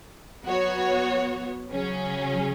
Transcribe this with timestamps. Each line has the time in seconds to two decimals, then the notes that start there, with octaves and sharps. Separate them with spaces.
0.44 F#3 B3 F#4 C#5
1.71 C#3 F#3 C#4 G#4